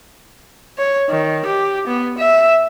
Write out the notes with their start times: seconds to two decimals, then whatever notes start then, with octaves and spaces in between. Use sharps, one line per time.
0.78 C#5
1.10 D#3
1.46 G4
1.88 B3
2.18 E5